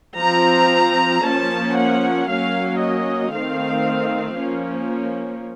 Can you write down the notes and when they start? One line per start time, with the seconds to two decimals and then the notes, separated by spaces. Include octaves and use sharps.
0.18 F3 C4 A#5
1.22 F3 A#3 C#4 A5
1.76 F#5
2.27 F#3 A#3 C#4 F5
2.79 D#5
3.32 D#3 A3 C4 F5
4.37 F3 A#3 C#4